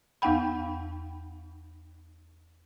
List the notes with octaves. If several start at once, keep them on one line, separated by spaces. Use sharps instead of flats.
E2 B3 D#4 F#5 G5 B5